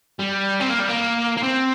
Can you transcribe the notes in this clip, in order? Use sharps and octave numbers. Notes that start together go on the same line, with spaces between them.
G3
C4
A#3
G3
A#3
A#3
C4